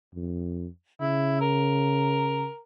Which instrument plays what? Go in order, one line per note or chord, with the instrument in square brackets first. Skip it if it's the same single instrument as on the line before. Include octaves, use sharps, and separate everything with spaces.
[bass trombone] F2
[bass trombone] C#3 [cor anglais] E4
[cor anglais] A#4